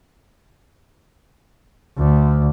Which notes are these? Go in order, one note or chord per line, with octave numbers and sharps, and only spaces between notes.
D2